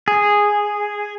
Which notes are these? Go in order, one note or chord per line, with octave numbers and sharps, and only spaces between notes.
G#4